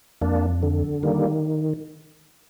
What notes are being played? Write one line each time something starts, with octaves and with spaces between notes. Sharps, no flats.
F2 A#3 D4
D3
D#3 G3 A#3